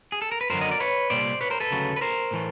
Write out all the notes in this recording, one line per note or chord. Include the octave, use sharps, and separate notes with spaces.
G#4
A4
A#4
B4
F#2 D3 F#3 A#4 C5
D#5
D5
B4 C#5
C2 A#2 G3 C5 D5
B4 C#5
A#4 C5
A4 B4
D2 C#3 F#3
B4
A#4 C5
A2 E3 A3